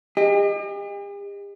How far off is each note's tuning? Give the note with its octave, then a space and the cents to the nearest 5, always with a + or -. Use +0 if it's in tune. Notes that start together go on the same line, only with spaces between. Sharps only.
G4 +45 D#5 -10